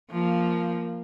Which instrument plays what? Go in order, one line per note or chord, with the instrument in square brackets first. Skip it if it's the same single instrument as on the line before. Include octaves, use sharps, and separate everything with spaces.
[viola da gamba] F3 A#3